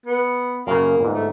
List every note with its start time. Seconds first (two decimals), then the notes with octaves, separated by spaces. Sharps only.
0.06 B3
0.67 F#2 C#3 A#3
1.01 G1 G#2
1.15 A3